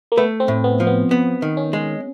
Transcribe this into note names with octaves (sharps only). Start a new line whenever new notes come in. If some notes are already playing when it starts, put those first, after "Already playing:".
A#3
A3 B3
C4
A2
B3
F3
B3
B3
D#3
C#4
G#3